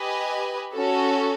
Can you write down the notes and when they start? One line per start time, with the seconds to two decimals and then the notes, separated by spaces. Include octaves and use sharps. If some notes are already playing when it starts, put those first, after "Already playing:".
Already playing: G4 B4 D#5 G#5
0.73 C#4 F#4 A4